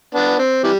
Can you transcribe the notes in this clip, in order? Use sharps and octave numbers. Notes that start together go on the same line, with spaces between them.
B3 D4
C4
C3 E3 G3